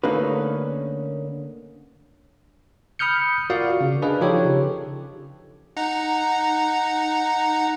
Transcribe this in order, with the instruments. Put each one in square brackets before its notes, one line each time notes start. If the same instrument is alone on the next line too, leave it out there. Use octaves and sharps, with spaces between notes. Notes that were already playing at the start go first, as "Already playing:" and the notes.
[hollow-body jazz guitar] D3 A3 A#3 C#4 D#4 B4
[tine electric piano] B5 D#6 F6 G6 C#7
F4 F#4 A#4 D5 F5
C#3
D4 G#4 B4 D#5 F5
F3 D#4 F4 G4 A4 C#5
C#3
[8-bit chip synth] D#4 F#5 A#5